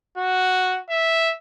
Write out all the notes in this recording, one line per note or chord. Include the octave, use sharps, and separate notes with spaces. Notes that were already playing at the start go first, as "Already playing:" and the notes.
F#4
E5